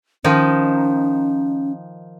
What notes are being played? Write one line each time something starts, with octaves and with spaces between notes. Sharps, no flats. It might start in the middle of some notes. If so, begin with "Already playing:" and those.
D#3 F3 C#4 D#4